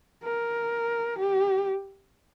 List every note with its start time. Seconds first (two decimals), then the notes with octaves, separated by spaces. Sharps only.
0.24 A#4
1.19 G4